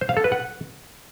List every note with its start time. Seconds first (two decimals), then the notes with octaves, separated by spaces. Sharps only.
0.01 C5
0.09 F5
0.17 A4
0.24 B4
0.32 F#5